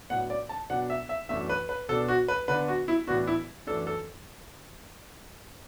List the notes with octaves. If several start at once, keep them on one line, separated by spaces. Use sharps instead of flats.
A2 F#3 B3 D4 F#5
D5
A5
B2 F#3 B3 D4 F#5
E5
E5
F#2 E3 A3 D4 E5
B4
B4
B2 B3 D4 A4
F#4
B4
D3 B3 D4 B4
F#4
E4
A2 E3 B3 D4 F#4
E4
F#2 E3 A3 D4 A4
A4